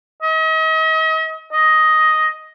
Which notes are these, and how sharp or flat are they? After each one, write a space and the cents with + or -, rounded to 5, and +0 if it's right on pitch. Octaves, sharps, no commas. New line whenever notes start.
D#5 +40
D#5 +5